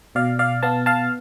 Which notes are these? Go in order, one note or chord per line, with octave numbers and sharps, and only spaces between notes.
B2 D5 F5
D5 F5
B3 F5 A5
F5 A5